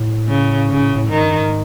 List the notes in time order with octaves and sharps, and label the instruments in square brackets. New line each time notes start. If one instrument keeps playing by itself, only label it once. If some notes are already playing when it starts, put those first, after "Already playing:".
Already playing: [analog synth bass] A2
[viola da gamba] C#3
[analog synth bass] G#2 [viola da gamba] C#3
[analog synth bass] A2
A2
[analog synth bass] G#2 [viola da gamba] D#3
[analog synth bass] G2
G#2